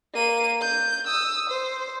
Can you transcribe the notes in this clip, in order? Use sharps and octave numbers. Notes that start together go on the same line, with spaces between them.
A#3 D#7
G6
D#6 E6
C5